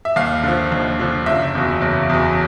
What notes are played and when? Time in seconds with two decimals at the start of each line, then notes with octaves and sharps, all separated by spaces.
0.05 E5
0.16 D#2 F5
0.43 D3 F3
0.72 D#2
0.99 D3 F3
1.26 F#1 E5
1.55 E2 B2
1.82 F#1
2.09 E2 B2